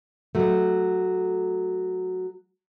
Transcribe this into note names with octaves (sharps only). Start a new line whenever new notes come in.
F#3 A3